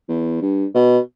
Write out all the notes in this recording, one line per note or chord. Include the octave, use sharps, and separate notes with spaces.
E2
G2
B2